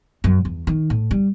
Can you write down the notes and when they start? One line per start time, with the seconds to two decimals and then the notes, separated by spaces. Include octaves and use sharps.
0.24 F#2
0.45 E2
0.67 D#3
0.90 A2
1.11 G3